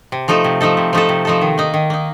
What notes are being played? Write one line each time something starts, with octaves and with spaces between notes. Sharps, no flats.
C3
F3 A3 D#4 A4
C3
F3 A3 D#4 A4
C3
F3 A3 D#4 A4
C3
F3 A3 D#4 A4
D#3
A#3 D#4
D#3
A#3 D#4